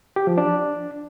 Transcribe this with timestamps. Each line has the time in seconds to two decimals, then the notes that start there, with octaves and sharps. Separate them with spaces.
0.16 G4
0.27 F3
0.38 D4